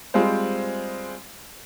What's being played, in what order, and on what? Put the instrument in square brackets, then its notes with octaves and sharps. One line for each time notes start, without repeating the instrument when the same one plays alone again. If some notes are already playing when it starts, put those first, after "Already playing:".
[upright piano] G3 G#3 C4 F4 C5